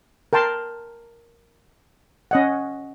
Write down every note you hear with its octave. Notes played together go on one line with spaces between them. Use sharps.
A#4 G5 A5 C6
C#4 D#5 F#5